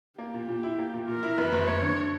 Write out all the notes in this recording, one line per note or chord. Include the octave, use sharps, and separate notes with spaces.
A#3 G4
A#2
A#2
E4
A#3
A#2
A#2 A#4
E4
F#2 B4
F#1
F#1 C#5
D3